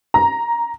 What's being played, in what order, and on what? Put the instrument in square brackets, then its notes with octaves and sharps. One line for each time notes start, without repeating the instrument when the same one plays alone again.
[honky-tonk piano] A#5